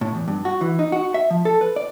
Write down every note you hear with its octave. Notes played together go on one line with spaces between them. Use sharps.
A2
E2
G2
F#4
E3
D#4
F#4
E5
F3
A4
B4
D5